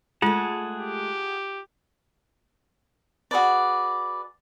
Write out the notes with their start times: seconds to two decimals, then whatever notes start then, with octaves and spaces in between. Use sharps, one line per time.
0.22 G#3 A3 F4 G#4 F#5 A5
0.77 G4
3.31 F#4 G#4 B4 D5